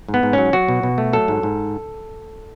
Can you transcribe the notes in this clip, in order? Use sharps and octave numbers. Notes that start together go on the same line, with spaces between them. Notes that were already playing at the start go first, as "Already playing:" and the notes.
G#2
B3
G#2
F#3 C#4
F#3 F#4
B2
B2
A3
F#3 A4
G#2
G#2